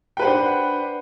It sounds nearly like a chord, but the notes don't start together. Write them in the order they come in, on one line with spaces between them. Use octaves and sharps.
G5 B4 C5 F#5 D4